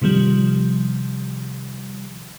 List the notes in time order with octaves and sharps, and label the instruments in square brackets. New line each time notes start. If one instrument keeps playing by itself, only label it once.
[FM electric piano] C3 D#3 F3 G3